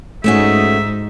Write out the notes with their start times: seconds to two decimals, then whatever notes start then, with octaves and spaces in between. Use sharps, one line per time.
0.24 G#2 A3 C#4 D#4 F#4 E5